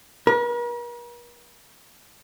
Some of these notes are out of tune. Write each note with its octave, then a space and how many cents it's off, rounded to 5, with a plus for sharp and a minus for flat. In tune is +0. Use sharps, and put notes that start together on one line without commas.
A#4 +45